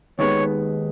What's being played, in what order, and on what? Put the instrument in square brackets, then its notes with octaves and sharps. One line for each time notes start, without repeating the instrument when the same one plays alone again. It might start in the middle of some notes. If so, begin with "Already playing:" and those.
[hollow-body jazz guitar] D#2 D#3 G#3 B3 [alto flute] C#5